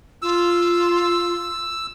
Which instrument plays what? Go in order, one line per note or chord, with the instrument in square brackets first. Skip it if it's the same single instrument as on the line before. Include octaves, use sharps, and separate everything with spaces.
[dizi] F4 [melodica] E6